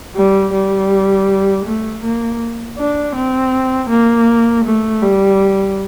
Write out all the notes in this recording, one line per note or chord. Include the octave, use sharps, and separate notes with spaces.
G3
G3
A3
A#3
D4
C4
A#3
A3
G3